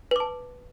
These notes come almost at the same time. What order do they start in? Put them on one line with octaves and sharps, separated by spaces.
B4 D6 A5